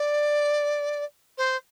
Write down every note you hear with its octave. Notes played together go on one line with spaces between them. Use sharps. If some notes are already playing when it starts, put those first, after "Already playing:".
Already playing: D5
C5